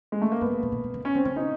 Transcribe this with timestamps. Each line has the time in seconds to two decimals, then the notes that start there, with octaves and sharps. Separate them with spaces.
0.12 G#3
0.22 A3
0.32 A#3
0.41 G2 B3
0.51 G#2
0.63 A#2
0.72 B2
0.84 A#2
0.94 C#3
1.05 C#4
1.15 D3 C4
1.25 C#3 C#4
1.36 D#4